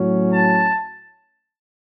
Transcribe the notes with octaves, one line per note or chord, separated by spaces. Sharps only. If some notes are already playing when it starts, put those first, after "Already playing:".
Already playing: A2 F#3 C#4
A5